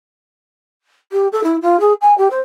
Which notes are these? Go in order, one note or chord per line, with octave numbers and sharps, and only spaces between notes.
G4
A4
E4
F4
G#4
G#5
G4
C5